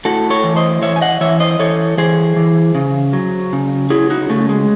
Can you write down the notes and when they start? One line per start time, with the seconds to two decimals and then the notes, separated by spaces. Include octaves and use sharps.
0.05 A2 F#4 A4
0.30 A4 C#5
0.44 E3
0.56 C5 D#5
0.82 E3 C#5 E5
0.96 G#5
1.01 D#5 F#5
1.21 E3 C#5 E5
1.40 C5 D#5
1.59 E3 A4 C#5
1.98 E3 G#4 C5
2.36 E3
2.75 C#3
3.13 F#3
3.53 C#3
3.90 F#3 E4 G#4
4.10 D#4 F#4
4.29 C#3 A3
4.49 G#3